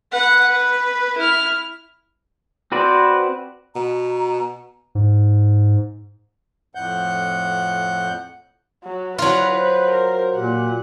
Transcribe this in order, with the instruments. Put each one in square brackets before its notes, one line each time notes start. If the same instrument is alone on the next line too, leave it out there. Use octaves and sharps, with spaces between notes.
[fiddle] B4 F#5
B4
E4 F6
[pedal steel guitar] C4 F#4 B4 C5 D5
[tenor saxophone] B2 [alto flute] A#5
[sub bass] G#2
[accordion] F2 A2 F#5 G6
[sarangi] F#3 [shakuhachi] F#5
[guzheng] F#3 F4 [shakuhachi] E4 [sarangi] B4
[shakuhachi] C5
[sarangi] A#4
[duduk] A#2 [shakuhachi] G4 [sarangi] F#5